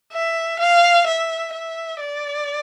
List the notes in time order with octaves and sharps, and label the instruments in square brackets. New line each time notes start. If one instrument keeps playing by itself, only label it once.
[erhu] E5
F5
E5
E5
D5